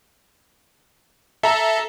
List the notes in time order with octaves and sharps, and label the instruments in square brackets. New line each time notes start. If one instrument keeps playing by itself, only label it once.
[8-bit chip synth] A4 [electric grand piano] E5 A#5